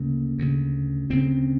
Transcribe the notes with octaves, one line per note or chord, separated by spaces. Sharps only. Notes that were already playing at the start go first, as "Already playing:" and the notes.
Already playing: D2 C#3 A#3
D2 C#3
D2 C#3 C4